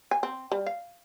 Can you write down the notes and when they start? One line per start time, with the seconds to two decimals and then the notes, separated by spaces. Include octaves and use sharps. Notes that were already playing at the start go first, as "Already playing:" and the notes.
0.11 G#5
0.23 C4
0.52 G3
0.66 F5